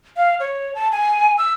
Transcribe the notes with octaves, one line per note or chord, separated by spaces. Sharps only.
F5
C#5
A5
G#5
E6